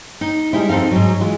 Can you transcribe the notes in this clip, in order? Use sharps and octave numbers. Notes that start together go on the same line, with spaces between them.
D#4
G3 G#3 D#4 E4
F2 C4 D#4 A4 F5
G#2 F#3
E3 G#3 F4